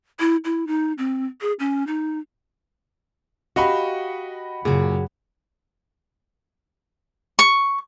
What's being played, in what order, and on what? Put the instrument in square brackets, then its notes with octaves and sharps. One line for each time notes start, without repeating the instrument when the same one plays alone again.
[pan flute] E4
E4
D#4
C4
G#4
C#4
D#4
[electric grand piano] F#4 D#5 C#6 [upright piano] G4 F#5 B5 [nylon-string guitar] F5
[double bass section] F#2 C#3 [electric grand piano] A#2 [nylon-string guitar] F#4 G#4
[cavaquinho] C#6